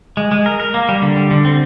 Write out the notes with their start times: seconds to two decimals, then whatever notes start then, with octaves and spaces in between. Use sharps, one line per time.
0.17 G#3
0.32 G#3
0.46 A#4
0.60 A#4
0.74 A#3
0.89 G3
1.02 D3
1.17 G3
1.31 D3
1.45 C4